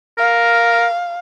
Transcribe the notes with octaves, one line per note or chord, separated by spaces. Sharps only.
A#4 F5